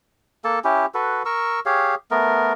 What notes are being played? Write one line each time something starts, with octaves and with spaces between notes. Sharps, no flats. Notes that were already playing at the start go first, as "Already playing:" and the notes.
A#3 A4 A5
C#4 E4 G4
F#4 A4 B4
A#4 C#6 E6
G4 G#4 C#5 F5
A3 B3 A#4